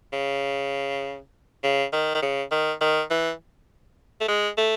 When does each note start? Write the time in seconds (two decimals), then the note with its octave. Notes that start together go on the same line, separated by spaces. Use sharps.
0.13 C#3
1.63 C#3
1.93 D#3
2.15 D#3
2.22 C#3
2.52 D#3
2.81 D#3
3.10 E3
4.21 A3
4.28 G#3
4.57 A3